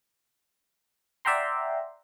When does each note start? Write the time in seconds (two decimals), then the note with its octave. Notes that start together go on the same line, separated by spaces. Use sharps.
1.25 D5 E5 F#5 G5 A#5 C6